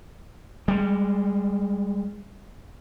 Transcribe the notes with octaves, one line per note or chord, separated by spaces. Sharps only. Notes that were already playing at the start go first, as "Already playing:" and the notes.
G3 G#3